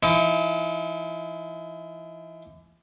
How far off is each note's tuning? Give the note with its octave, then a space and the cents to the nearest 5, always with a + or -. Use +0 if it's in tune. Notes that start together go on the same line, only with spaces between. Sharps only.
E3 +40 D#4 +45